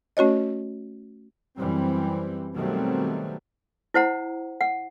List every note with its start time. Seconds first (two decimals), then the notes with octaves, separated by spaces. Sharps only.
0.17 A3 C#4 F#4 C#5 D#5
1.57 F#2 E3 G3 C4
2.54 B2 D#3 F#3 G3 A3 C4
3.94 E4 C5 F#5 A#5
4.61 F#5